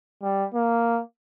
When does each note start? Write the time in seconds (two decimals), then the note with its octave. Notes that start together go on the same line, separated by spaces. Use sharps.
0.22 G3
0.54 A#3